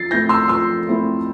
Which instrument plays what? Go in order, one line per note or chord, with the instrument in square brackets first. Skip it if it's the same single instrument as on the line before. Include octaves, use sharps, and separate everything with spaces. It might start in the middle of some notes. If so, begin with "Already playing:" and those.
Already playing: [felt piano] F3 [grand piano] A6 C7
[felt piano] A3 C4 E4 [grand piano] G6 A#6
[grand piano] C6 E6
[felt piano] F3 [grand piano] C6 E6
[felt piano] A3 C4 E4